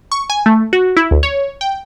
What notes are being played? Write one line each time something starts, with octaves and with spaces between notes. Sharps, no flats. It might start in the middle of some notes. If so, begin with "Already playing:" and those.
C#6
G#5
A3
F#4
E4
D2
C#5
G5